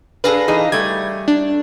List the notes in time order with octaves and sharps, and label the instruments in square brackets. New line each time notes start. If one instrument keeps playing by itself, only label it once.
[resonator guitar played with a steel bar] D4 G#4 A4 [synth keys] B4 F5 A#6
[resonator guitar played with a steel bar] E3 D#4 G#4
[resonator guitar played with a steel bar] G3 A3 [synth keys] G#6
[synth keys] D4